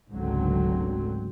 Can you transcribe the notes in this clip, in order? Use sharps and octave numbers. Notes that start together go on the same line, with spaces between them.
F1 C#2 G#2 D3 F#3 C4